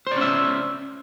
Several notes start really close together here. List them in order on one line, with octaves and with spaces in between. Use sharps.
C5 D5 C#4 E5